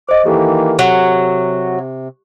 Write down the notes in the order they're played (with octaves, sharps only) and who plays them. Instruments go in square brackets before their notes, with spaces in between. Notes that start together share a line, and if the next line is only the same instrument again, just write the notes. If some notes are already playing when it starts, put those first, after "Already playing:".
[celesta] C5 D#5 [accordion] D6
[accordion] D#3 E3 A#3 [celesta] G4 A4
[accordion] C3 [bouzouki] F#3